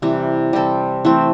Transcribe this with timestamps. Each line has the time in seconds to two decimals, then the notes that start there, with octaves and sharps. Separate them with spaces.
0.02 C3 E3 G3
0.53 G3 C4 A4
1.05 E3 A3 C4